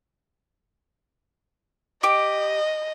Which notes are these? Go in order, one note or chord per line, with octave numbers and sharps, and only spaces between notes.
G4 D#5 D6